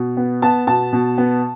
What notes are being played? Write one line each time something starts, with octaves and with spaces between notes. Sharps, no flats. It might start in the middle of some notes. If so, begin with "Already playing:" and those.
Already playing: B2
B3
B3 A5
B2 A5
B2
B3